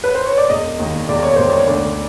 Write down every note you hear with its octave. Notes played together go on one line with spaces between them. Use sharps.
B4
C5
C#5
D5
E1 D#5
D#2
E1 D5
C#5
E1 C5
C#5
D2 D5